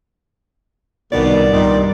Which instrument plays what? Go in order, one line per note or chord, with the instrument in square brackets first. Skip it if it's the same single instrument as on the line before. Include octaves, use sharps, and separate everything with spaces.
[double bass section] C2 [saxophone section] B2 D#3 [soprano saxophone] D5
[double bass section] G2 [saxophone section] A#2 D#3 G3